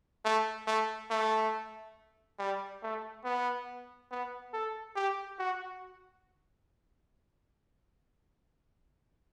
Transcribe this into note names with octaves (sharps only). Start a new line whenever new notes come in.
A3
A3
A3
G3
A3
B3
B3
A4
G4
F#4